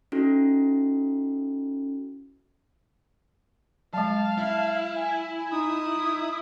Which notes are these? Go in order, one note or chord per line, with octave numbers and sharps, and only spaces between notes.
C#4 D#4 E4 F#4 A4
F#3 G#3 F5 A5
E4
G#5
D#4 D#6